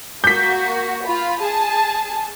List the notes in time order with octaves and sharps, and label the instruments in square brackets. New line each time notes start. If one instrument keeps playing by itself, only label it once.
[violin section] A#3 F#4 [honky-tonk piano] G6 B6
[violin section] F4 B5
G#4 A5